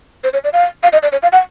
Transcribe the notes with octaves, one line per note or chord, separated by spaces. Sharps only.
C5
C#5
D5
F5
F5
D#5
D5
C#5
F5
F#5